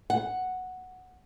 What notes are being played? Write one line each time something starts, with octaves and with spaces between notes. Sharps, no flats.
F#5